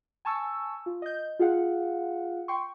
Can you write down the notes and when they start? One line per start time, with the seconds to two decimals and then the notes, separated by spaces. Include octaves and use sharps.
0.25 G#5 A5 C#6 E6
0.86 F4
1.02 D#5 G6
1.39 F4 G#4 F5 F#5
2.48 G5 C6 C#6